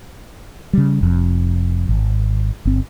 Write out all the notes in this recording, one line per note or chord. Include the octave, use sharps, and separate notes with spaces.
C#3 G3
F1 F2
G#1
G1 C4